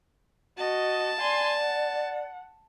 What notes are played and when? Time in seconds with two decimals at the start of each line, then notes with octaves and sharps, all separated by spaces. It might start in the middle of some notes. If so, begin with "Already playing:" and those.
0.58 F#4 D#5 A5
1.20 D5 G#5 C6
1.60 F#5